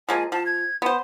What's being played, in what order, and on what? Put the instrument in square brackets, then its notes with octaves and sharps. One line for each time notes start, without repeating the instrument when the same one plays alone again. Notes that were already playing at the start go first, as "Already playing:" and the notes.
[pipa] F3 G#3 A#3 [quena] G#5
[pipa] F3 [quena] A5
[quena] G#6
[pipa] B3 C5 [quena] C6